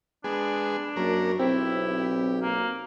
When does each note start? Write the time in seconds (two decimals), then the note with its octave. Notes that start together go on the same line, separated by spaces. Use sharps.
0.24 G#3 B3 D4 G#4
0.96 F#2 A#3 C#4 A#4
1.39 B1 C4 E4 G4
2.43 A#3